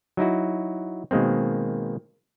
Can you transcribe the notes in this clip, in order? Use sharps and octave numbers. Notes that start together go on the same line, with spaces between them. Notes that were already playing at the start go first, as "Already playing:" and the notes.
F#3 D#4 E4 F#4
B2 D#3 G#3 A#3 C4